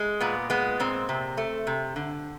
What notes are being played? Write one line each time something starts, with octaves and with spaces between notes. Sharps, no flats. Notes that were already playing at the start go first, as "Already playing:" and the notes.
Already playing: G#3
A#2 B3
G#3 B3
A#2 C4
C3
A3
C3
D3